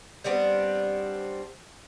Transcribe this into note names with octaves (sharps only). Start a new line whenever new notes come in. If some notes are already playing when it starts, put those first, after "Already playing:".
G3 B3 C4 D4